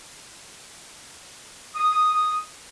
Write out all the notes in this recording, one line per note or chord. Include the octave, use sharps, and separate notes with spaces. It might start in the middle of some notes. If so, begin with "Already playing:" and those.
D#6